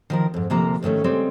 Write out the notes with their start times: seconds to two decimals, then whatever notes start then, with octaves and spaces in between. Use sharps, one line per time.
0.10 D#3 F3 A#4
0.34 F2 G#2
0.50 D2 C3 F3 A#3 A#5
0.83 G#2 D#3 A3 C#4
1.04 C#3 G3 G#3 C4